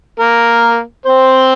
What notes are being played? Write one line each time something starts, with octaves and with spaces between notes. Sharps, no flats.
A#3 A#4
C4 C5